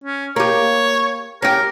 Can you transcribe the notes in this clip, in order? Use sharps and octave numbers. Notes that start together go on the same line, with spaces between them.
C#4
A#3 G4 C#5
C#4 G4 A#4